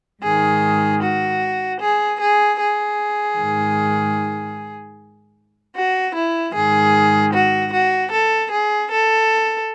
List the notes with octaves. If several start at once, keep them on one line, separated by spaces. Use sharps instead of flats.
G#2 D#3 G#4
F#4
G#4
G#4
G#4
G#2 D#3
F#4
E4
G#2 D#3 G#4
F#4
F#4
A4
G#4
A4